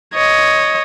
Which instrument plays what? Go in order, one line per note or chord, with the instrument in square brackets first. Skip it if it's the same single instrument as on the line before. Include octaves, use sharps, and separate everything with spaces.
[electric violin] C#5 D#5